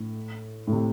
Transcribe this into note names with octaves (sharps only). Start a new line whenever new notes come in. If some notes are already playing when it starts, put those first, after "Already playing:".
Already playing: A2
A2
C3